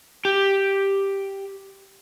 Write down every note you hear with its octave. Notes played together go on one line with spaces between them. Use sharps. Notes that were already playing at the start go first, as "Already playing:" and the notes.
G4